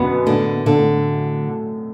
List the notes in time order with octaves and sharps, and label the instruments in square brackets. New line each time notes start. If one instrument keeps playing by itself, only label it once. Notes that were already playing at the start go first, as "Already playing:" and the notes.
Already playing: [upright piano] F#2 B2 D3 [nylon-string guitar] B3
[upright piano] A2 [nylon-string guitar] D3
[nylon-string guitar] D3
[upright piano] A2